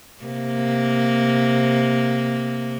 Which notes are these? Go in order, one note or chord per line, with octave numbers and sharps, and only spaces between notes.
C3 A#3